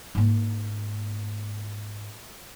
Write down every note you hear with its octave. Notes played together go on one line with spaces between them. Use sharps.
G#2 A#3